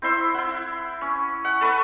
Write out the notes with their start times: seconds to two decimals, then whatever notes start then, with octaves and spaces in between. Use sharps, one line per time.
0.02 C4 E4 C6 E6
0.34 E4 F#5
1.01 C#4
1.45 F#5
1.61 A4 B4 B5 C#6